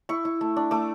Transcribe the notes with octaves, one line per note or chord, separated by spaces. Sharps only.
E4 C#6
E4
A3
D4
A3 D6